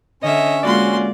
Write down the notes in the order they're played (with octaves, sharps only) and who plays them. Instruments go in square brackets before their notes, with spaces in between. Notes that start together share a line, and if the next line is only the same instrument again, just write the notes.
[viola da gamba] D3 [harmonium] C#4 [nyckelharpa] C#5 E5 [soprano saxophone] D#5
[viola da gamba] G#3 A#3 F4 [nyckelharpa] F#4 C6 [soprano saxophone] D5